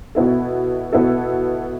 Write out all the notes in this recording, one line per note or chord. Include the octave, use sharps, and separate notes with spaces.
B2 B3 E4 A4
B2 B3 E4 A4